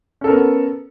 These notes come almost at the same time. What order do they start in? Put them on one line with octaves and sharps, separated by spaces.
C#4 A4 A#4 B3